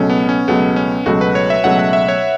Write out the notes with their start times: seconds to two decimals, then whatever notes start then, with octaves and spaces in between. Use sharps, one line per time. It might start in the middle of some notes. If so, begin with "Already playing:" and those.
Already playing: C#2 B2 F#3 A3 C#4
0.10 B3
0.29 C#4
0.48 C#2 B2 F#3 A3 B3
0.76 C#4
1.06 C#2 B2 F#3 A3 F#4
1.21 B4
1.35 C#5
1.50 E5
1.64 C#2 B2 F#3 A3 F#5
1.79 F#5
1.93 E5
2.08 C#5